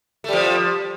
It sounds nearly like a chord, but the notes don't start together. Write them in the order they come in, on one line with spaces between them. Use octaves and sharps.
A3 G3 F3